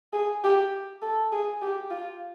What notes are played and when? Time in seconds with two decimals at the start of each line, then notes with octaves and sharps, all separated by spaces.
0.13 G#4
0.44 G4
1.02 A4
1.32 G#4
1.62 G4
1.91 F4